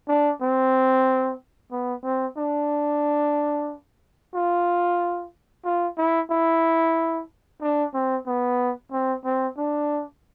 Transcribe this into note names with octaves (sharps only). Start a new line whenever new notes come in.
D4
C4
B3
C4
D4
F4
F4
E4
E4
D4
C4
B3
C4
C4
D4